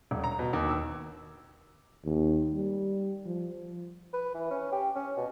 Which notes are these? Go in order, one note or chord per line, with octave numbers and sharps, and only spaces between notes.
D#1
A#5
B2
D#2
E6
D#2
G3
F3
B4
E3
C#4
G4
C#4
B2